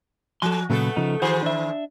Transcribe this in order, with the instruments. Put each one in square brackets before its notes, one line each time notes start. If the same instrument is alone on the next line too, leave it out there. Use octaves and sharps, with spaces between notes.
[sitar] F3 [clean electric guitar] A4 C6
[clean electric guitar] A#2 C#3 F#3 [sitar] A3 B3 A4
[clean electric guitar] C#3 F3 D#4
[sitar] D#3 C5 [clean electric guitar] F#4 G#4
[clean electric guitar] D4 E5